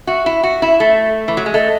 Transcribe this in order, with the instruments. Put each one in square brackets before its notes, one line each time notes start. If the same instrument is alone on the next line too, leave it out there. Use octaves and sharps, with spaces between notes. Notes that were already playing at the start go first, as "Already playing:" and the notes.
[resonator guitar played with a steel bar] F#4 [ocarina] E5
[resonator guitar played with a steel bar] E4
F#4
E4
A3
E3
F#3
G#3
[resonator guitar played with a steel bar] A3 [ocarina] D#5